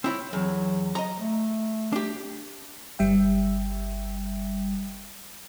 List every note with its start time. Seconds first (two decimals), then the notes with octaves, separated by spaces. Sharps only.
0.04 C4 E4 C#5
0.33 E2 F#3
0.95 D#5 A#5
1.19 A3
1.92 D4 G4
2.99 G1 G3 E5 G5